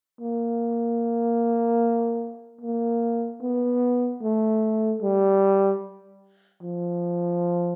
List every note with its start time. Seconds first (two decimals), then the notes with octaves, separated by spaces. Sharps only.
0.21 A#3
2.61 A#3
3.42 B3
4.22 A3
5.02 G3
6.63 F3